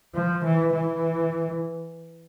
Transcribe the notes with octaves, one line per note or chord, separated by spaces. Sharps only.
F3
E3
E3